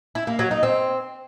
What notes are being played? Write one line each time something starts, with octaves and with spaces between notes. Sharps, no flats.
E4
A#3
F#3
D#4
C4